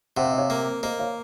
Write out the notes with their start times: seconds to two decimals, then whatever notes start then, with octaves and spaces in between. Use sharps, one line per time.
0.17 C3 F#5
0.24 F5
0.31 D#5
0.38 C#5 F5
0.50 A#3
0.83 A#3 C5 D#5
0.99 C#5 F5